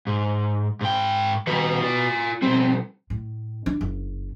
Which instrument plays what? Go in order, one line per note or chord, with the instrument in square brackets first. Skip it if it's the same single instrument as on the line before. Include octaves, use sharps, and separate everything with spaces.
[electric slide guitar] G#2
G#2 G5
[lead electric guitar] D#3 G3 [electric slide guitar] F#4 B4
[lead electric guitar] F4 D5
[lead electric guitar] B2 G3 [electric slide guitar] C4
[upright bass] A2
D4
F#1